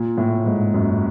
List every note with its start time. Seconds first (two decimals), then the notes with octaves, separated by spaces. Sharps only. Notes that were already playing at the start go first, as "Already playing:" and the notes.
Already playing: A#2
0.18 A2
0.46 G#2
0.74 F#2